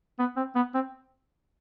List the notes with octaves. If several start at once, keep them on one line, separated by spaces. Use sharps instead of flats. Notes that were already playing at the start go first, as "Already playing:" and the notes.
B3
C4
B3
C4